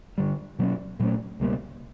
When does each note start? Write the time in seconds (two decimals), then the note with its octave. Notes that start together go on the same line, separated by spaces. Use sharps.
0.18 G2 D3 G3
0.59 B2 F#3 A#3 C#4
1.00 A#2 F#3 A3 C#4
1.40 C#2 B2 G3 A#3